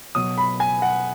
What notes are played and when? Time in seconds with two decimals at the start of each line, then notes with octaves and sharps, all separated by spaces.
0.15 B2 F#3 D#6
0.38 B5
0.60 G#5
0.82 F#5